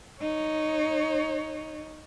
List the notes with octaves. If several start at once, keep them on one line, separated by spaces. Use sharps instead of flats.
D#4 C#5